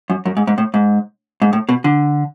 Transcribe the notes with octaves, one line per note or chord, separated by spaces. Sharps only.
F#2
F#2
G#2
G#2
A2
G#2
G#2
A2
B2
D3